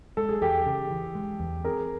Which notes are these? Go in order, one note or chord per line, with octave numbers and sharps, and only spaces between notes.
G#3 A4
G#4
E2 G4 A4
C#3
E3
G#3
E2
C4 G#4 A#4